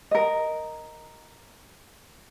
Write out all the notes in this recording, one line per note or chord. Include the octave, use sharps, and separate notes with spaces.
A#4 D#5